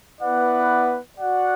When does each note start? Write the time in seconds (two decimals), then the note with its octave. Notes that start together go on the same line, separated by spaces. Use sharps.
0.20 B3 E4 B4 D5 F#5
1.18 F#4 D5 F#5